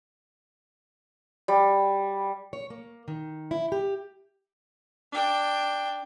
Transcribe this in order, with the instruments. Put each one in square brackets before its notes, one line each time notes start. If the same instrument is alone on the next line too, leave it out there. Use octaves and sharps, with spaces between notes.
[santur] G3
[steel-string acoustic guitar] C#5
A#3
D#3
E4
G4
[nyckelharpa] D4 G5